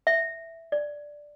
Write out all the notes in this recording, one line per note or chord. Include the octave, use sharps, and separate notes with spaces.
E5
D5